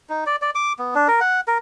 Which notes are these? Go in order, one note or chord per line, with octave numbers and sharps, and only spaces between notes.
D#4
D5
D5
D6
B3
D4
A#4
F#5
A#4